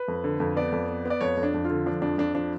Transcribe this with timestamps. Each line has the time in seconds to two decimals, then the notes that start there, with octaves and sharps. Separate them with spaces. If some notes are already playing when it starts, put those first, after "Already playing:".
Already playing: B4
0.08 F2
0.24 D3
0.40 F2
0.56 B3 D5
0.72 F2
0.89 B3
1.05 B3
1.10 D5
1.21 F2 C#5
1.37 F2
1.43 D4
1.54 F2
1.64 F4
1.70 D3
1.86 F3 D4
2.02 F2 D4
2.18 F2 D4
2.35 F3 D4